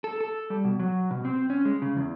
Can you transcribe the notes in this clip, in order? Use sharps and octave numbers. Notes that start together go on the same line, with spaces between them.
A4
A4
G3
B2
F#3
B2
C4
C#4
G#3
C#3
E2